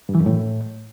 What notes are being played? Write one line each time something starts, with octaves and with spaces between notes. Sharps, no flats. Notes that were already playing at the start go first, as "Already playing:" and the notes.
G2
E3
F#2
A2